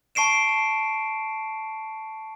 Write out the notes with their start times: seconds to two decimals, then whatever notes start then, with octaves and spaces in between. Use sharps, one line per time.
0.15 A5 C#6 C7 D7 E7